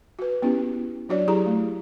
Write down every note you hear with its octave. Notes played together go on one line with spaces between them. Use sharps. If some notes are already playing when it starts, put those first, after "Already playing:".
F#4 B4
B3 C#4 E4 G4
F#3 D4 F#4 C#5 D5
F#3 E4 G4 G#4 A#5
A3